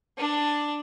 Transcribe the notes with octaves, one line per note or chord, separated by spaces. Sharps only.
D4 A5